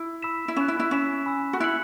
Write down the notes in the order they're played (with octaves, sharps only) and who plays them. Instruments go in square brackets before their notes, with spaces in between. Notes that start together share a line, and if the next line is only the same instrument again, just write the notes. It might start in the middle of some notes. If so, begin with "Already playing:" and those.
Already playing: [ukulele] E4
[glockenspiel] B5 E6 B6 E7
[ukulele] E4
[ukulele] C#4 [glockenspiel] F#6 E7
[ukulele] E4
E4
[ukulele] C#4 [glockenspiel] E6 B6 E7
[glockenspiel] G#5 B5 E6
[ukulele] F#4
[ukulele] E4 [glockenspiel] F#6 C#7 F#7